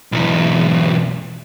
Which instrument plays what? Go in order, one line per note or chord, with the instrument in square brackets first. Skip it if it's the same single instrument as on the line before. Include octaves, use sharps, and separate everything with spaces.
[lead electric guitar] B1 E2